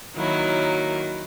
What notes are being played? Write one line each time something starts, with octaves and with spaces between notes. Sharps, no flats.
D#3 F#3 A#3 E4